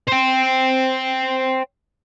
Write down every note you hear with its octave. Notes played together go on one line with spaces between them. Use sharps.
C5 G5